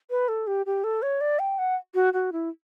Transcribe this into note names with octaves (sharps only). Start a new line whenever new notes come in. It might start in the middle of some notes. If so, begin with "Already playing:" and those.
B4
A4
G4
G4
A4
C#5
D5
G5
F#5
F#4
F#4
E4